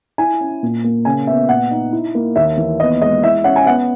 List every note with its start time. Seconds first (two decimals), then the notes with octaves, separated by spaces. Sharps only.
0.18 E4 G#5
0.41 C#4
0.63 A#2
0.84 A#3
1.05 C#3 G#5
1.27 B3 E5
1.49 A#2 F#5
1.71 D#4
1.93 E4
2.15 A#3
2.36 D#2 E5
2.57 E3
2.80 B3 D#5
3.01 G#3 D#5
3.23 E4 E5
3.44 C#4 F#5
3.56 G#5
3.66 B3 F#5